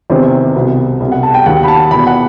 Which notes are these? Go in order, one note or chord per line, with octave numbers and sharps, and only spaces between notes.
E2 C3 D#3 C5
C2 B2
C2 B2
F#5
A5
G5
D#2 D#3 F#5
B5
A5
E2 B2 B5
F#5